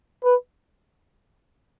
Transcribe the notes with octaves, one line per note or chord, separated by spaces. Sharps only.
B4